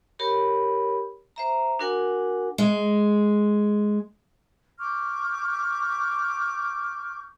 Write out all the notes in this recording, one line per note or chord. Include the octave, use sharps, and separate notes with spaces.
G4 A#4 C#5 B5
C5 E5 A#5
D4 F#4 A#4 F#5 G#5
G#3
C#6 D6 F6 G6